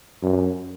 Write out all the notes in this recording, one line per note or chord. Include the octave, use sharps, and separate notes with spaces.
F#2